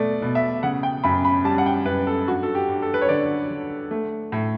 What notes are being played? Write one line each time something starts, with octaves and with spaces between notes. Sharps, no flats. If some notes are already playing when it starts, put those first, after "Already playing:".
Already playing: B2 A3 D5
B2
E5
C#3 F#5
G5
F#2 B5
B5
G3 A5
F#5
G5
F#2 B4
A4
G2 F#4
A4
G4
G2
A4
B4
C#5
D3 D5
D3
A3
A2